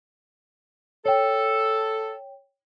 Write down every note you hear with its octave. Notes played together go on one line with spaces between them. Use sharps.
A4 C#5 G5